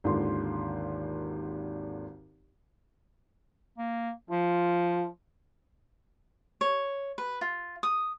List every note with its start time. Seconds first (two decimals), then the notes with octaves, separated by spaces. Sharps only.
0.04 G#1 D#2 D3 F4 C6
3.78 A#3
4.30 F3 F4
6.61 C#5
7.18 B4
7.41 F4
7.83 D#6